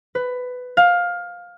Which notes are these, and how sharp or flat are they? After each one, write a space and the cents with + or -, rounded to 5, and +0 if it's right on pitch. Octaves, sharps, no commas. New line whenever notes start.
B4 +15
F5 +15